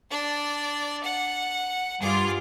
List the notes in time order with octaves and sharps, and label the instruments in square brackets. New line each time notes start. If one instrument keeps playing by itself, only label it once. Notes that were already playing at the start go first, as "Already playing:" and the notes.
[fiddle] D4 D5
F#5
[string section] G2 F4 [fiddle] G#4 D6